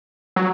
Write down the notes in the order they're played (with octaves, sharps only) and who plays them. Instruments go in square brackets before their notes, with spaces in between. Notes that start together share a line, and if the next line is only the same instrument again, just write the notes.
[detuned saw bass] F#3